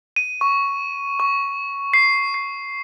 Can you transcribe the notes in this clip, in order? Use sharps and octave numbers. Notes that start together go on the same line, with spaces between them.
D#7
C#6
C#6
C7
C7